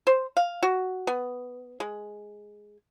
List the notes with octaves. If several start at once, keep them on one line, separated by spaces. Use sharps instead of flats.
C5
F5
F#4
B3
G#3